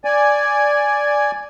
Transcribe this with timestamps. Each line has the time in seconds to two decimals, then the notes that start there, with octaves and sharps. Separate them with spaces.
0.05 D5 G#5